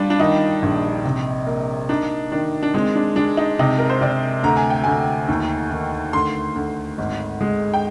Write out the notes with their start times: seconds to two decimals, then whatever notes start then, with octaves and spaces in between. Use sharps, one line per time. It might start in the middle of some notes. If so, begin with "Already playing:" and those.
Already playing: G3 D4 F4
0.10 D4
0.20 D#3 D#4
0.62 A#1
1.05 C3
1.47 A#3
1.89 D4 D#4
2.32 D#3 D4
2.63 D4
2.74 G#3 C4
2.96 D4
3.16 G#3 D4
3.37 D#4
3.59 C3 D#4
3.79 A#4
3.90 C5
4.01 C3 D5
4.43 D2 A#5
4.57 G#5
4.70 G5
4.84 D2 G#5
5.28 D#2
5.71 D#3
6.13 D2 C6
6.56 D2
6.98 G#1
7.41 G#3
7.74 G5